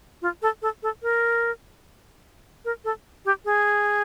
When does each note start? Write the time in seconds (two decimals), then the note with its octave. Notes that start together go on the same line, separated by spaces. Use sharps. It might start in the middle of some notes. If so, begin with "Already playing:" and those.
0.22 F4
0.42 A4
0.62 A4
0.83 A4
1.03 A#4
2.65 A#4
2.85 A4
3.25 G4
3.45 G#4